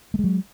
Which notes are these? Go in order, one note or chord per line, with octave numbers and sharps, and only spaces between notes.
F#3 G#3 A3